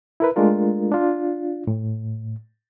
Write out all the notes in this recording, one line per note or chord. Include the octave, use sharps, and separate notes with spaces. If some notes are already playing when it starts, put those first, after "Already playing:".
E4 A#4 B4
G#3 A3 D4 F4 A#4
D4 F4
A2